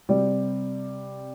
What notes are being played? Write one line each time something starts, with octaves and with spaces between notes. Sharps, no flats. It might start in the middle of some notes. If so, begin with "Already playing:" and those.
C3 G3 C4 G4 D5